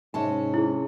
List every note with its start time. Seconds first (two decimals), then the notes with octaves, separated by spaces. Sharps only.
0.14 G#2 C3 C#4 A5
0.54 E4 G#4